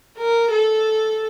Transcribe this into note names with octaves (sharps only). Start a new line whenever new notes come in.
A#4
A4